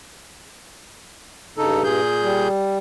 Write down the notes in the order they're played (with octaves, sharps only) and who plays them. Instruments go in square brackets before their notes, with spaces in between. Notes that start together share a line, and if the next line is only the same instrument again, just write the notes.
[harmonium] G2 [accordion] C#3 D#4 A4
[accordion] A#2 G#4 G6
[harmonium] G3